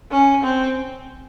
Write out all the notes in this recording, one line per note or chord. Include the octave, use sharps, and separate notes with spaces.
C#4
C4